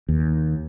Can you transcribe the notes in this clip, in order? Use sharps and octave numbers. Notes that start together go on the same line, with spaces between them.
D#2